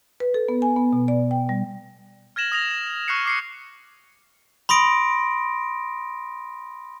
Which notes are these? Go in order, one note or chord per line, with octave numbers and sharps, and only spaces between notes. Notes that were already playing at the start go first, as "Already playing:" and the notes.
B4
A4
B3
G#5
B3
B2
D5
G5
G3
F6 G#6 A#6 E7 F#7
D#6 A#6 F7
C#6 F6 F#6 A#6 C7 C#7
D6 C7 C#7
B5 C6 D#6 A#6 D7